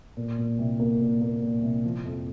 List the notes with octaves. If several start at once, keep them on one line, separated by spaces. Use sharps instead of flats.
A#2
A#2
C2
A#3
A#2
A#3
A#2
C2
F3
F2